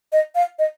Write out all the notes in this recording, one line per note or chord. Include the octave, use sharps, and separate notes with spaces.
D#5
F5
D#5